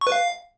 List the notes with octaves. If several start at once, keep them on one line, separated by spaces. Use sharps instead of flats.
C#6
B4
F5